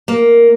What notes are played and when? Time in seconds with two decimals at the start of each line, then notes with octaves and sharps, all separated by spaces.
0.08 A#3